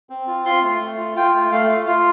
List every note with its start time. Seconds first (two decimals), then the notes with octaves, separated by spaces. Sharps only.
0.10 C4
0.27 F4
0.45 F4 C6
0.63 A3
0.81 A3
0.98 F4
1.15 F4 G5
1.34 A3
1.51 A3 F5
1.69 F4
1.86 F4 F5